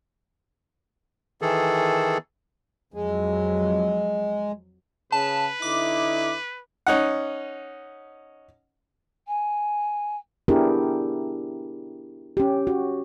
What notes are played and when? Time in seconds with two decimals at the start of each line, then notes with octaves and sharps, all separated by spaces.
1.42 D#3 E3 G#4 A4
2.94 F2 F#3 G#3
5.12 C#3 B4 A5
5.62 D3 D#4 E4 D6
6.87 C#4 D#4 F#5
9.28 G#5
10.48 B3 D4 E4 G4 G#4 A#4
12.37 C#4 G4
12.67 F#4